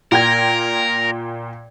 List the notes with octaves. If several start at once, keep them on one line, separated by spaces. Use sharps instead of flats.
A#2 A#4 G5 G#6